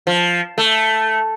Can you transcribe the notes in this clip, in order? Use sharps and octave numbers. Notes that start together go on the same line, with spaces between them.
F3
A3